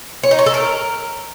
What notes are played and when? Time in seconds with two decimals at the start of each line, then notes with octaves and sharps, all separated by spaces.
0.23 C#5
0.31 D#4
0.39 C#5
0.46 A4
0.54 A#4